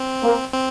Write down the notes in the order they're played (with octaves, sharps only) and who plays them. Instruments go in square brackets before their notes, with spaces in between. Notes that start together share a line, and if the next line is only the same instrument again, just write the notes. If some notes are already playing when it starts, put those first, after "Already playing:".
Already playing: [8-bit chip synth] C4
[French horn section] A#3
[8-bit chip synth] C4